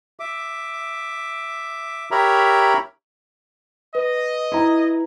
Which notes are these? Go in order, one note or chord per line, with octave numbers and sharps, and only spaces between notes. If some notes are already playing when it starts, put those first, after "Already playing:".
E5 D6
G4 A#4 C#5 E5 A#5 B5
B4 D#5
E4 A#5